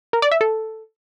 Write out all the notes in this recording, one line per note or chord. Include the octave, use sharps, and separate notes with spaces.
A#4
D5
E5
A4